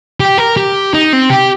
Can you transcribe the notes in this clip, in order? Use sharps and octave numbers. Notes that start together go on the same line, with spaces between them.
G4
A#4
G4
D#4
C4
G4